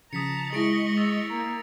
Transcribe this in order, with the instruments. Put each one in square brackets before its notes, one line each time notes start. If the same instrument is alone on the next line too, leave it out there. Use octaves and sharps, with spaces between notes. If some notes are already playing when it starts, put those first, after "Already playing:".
[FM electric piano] C#3 F3 [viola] A5 A#5 [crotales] D#6 B6 C#7
[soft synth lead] G#3 [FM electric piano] E4 G#4 [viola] D#5 C#6 [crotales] A#6 D7 F#7
[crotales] E6 A6 F7
[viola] A#3 [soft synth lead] A#5